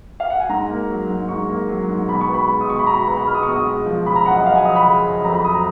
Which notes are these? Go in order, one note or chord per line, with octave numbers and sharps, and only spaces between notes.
F5
F#5
G#5
G#2 A#5
A#3
F#3
G#2
G#2 C#6
A#3
F#3
G#2
B2 B5
C#6
B3
B5
G#3
D#6
B2 C#6
B5
B2 A#5
B5
B3 A#5
B5
G#3 F6
D#6
C#6
B2
D#6
G#3
F3
C#3 B5
A#5
F#2 F#5
D#5
G#3 F5
G#5
F3 D#6
B5
C#3
F#2
F2 A#5
B5
F#3 D#6
A#5